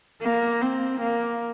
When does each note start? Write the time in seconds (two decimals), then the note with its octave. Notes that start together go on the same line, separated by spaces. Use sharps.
0.22 A#3
0.61 C4
1.00 A#3